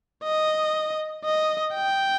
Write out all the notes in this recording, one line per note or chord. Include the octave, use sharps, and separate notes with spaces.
D#5
D#5
G5